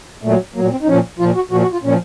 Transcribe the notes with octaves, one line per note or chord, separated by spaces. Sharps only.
A#2 F#3 A3
A#2 F#3 A#3
C4
D#4
A#2 F3 C#4
A#2 F3 F4
F#4
A#2 F3 F#4
F#4
F4
A#2 F3 C#4